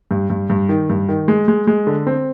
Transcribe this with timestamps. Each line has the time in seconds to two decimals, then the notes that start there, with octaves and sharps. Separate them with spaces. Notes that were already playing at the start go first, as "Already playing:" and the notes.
0.11 G2
0.30 G2
0.50 G2
0.69 D#3
0.90 G2
1.09 D#3
1.28 G#3
1.48 G#3
1.67 G#3
1.87 D3
2.07 C4